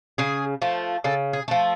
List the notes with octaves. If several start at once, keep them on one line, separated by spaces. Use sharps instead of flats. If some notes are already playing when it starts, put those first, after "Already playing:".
C#3 G#4
F3 A3
C#3 A4
G#4
F3 A3